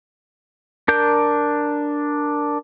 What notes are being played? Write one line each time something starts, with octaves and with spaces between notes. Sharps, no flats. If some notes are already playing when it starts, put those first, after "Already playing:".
D4 A#4 G6